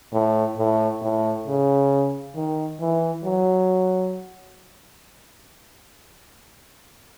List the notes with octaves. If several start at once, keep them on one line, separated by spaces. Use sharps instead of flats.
A2
A2
A2
C#3
D#3
E3
F#3